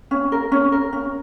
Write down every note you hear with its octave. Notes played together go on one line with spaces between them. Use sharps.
C#4
A#4
C#4
A#4
C#4